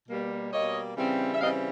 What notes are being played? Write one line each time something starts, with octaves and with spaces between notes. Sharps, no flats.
B2 G3 A#3
B2 G3 A#3 C#5 D#5
C#3 E3 G3 C4
E5
C#3 E3 G3 C4 D#5 F5